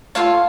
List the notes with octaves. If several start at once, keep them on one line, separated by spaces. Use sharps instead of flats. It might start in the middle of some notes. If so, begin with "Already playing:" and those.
F4 A4 C#5 F5